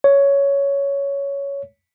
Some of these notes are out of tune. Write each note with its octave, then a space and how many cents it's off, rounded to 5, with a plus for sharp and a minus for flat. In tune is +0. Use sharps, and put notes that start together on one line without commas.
C#5 +10